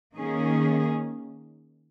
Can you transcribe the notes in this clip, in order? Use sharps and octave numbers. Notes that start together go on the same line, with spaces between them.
D#3 A#3 C#4 G#4